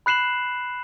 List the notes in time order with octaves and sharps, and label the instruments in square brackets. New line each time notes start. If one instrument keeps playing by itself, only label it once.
[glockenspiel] B5 F#6 C7 E7 F#7